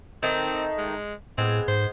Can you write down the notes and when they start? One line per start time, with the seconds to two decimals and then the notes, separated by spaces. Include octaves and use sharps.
0.23 D#3 A3 C4 D#4
0.78 G#3
1.38 A2 G#3 B3 C4
1.68 G#2 C5